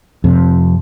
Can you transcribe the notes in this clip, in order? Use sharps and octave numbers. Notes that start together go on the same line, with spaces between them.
F2 C3